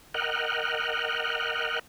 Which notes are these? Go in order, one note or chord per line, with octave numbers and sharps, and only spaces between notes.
A#4 D#5 F#5 G5 F6 F#6